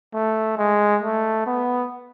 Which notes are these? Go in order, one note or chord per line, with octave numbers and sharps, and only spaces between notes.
A3
G#3
A3
B3